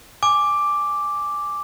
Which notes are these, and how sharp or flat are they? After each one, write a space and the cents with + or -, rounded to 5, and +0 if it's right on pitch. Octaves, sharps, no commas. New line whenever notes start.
G#5 +0 D6 +0